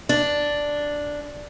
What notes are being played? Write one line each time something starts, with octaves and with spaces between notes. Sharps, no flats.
D4